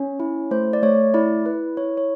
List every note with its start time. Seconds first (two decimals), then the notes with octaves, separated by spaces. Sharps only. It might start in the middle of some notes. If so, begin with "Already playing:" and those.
Already playing: C#4 C#5
0.20 E4
0.51 A3 C5
0.73 D5
0.82 A3 C#5
1.14 E4 D5
1.45 E4 B4
1.77 E4 C#5
1.97 C#5